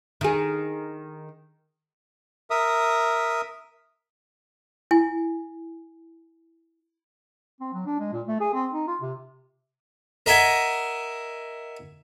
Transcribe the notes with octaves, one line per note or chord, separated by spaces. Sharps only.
D#3 G#4
A#4 E5 D#6
E4 G#5
C4
F#3
D4
G#3
A#2
A3
G#4
C4
D#4
F4
C3
A#4 D#5 E5 F#5 G#5